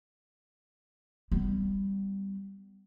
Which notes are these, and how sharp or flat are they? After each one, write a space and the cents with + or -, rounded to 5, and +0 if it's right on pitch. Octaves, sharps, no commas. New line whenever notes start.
G3 +0 B3 +35